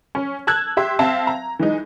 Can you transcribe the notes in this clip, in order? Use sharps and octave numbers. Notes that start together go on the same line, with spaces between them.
C#4
A5 E6 F#6 G#6
G4 E5 C6
C4 E5 F5 A5
A#5
E3 G#3 D#4